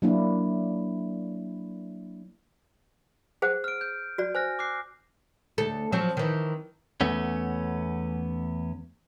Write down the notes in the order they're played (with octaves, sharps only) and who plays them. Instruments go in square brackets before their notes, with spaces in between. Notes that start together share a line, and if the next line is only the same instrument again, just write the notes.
[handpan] F#3 A#3 D4 E4
[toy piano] G#4 C5 F#5
[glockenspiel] F6 D7
G6
[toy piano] F#4 D5
[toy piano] C5 [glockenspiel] G#5 F6 A#6
[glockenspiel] D6 F#6 C7
[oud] D2 A4
F3 F#3 C4
D#3 E3
[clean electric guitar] E2 A3 B3 C#4